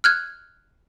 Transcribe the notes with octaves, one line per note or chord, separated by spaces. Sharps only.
F6 F#6 G#6